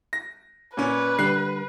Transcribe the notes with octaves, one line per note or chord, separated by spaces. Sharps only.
A#6
A#2 C#4 B4
D3 G3 F#6 C7